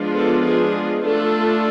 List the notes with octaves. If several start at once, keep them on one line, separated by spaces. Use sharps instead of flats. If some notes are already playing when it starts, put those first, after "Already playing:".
Already playing: F3 G#3 B3 D4 F4
A4
G#4
A3 D4 F4 A4